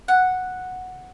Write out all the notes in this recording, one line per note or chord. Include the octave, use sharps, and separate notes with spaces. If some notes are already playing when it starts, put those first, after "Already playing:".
F#5